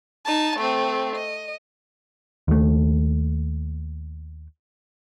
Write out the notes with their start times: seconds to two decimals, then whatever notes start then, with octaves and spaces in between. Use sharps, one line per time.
0.25 D#4 A5
0.58 A3 C4
1.15 D#5
2.48 D#2 A3